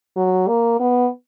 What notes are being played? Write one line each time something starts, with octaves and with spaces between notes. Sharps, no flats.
F#3
A#3
B3